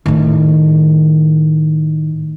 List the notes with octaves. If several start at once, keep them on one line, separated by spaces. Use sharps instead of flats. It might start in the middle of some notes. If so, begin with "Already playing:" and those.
A2 D#3